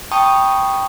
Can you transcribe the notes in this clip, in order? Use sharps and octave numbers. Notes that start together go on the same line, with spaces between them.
G5 A5 B5 C#6 D#6